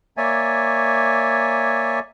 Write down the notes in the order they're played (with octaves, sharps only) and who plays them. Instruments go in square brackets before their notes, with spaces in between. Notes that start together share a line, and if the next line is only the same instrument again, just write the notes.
[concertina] A#3 C#5 D5 E5 G#5